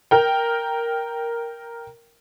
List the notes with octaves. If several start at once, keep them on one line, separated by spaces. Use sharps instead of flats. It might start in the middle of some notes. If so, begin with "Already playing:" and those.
A#4 G5